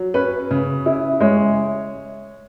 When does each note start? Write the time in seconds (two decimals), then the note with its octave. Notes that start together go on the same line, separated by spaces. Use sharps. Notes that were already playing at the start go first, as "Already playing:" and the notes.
Already playing: F#3
0.14 C#4 B4
0.51 C#3
0.86 E4
1.21 G#3 C#5